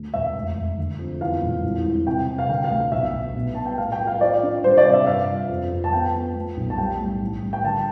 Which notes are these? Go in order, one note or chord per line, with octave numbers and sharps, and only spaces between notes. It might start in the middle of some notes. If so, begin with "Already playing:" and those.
Already playing: D2
E1 E5
F1
F1
D3
F2
E2 F5
E1
C2
E4
C3 G5
C3
F5
D3 G5
F5
D2
B1 E5
B2
B2
B3 A5
G5
A2 F5
G5
F3
F5
F3 D5
D4
G3 C5
D5
C3
E5
G2 F5
F3
F2
F2
A5
B3 G5
B3
A3
B1
A5
G3 G5
A2
A1
G3
G5
D3 A5